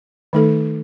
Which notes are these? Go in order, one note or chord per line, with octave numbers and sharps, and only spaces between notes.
D#3 A3 D#4 A4